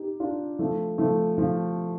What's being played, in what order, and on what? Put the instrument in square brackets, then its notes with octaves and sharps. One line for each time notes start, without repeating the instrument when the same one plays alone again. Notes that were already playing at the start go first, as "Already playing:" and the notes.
Already playing: [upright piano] D#4 G4
D4 F4
F3 A3
F3 A3
F3